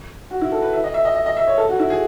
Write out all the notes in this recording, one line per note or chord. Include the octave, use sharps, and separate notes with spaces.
F#4
E4
A4
B4
E5
D#5
E5
D#5
D#5
D#5
E5
C#5
A4
F#4
E4
G#4